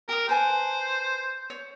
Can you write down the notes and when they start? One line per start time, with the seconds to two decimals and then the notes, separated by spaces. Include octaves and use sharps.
0.09 G4 A#4 D#6
0.29 B4 C5 G#5 A5
1.50 C#5